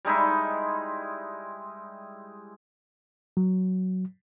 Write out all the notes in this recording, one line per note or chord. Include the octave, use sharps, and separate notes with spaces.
G3 G#3 D#4 E4
F#3